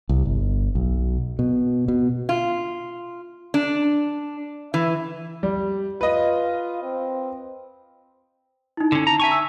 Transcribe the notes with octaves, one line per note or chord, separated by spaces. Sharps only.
C2
G1
B1
B2
B2
F4
D4
E3
G3
F4 B4 D#5
C4
D#4 E4
D3 C#4
A5 A#5
E5 G#5 C#6
E6